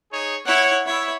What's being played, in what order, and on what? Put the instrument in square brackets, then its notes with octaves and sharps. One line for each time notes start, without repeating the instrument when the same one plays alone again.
[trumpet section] D#4 G#4 C#5
[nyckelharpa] E4 F#5 [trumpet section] C#5
[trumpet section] E4 [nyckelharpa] C#5